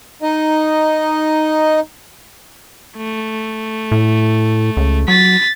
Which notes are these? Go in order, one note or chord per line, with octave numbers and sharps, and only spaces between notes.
D#4 D#5
A3
A2
C#2
F#3 A6 B6